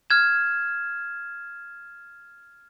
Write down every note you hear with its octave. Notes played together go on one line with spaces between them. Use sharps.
F6 G#6 E7